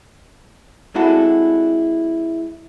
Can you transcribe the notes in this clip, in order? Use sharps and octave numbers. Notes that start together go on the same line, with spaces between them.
G#3 C4 D4 E4 F#4 A4